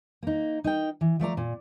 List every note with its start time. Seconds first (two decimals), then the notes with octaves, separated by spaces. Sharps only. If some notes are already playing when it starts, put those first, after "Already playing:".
0.23 A#3 D#4
0.64 D#4 A#4 G5
1.01 E3
1.19 F3 A3 D5 A#5
1.37 A#2